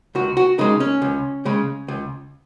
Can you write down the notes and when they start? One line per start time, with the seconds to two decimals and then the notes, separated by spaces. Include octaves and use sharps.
0.15 C#2 F#4
0.37 F#4
0.58 C#3 G#3 D#4
0.80 C#4
1.02 C#2
1.45 C#3 G#3
1.88 C#2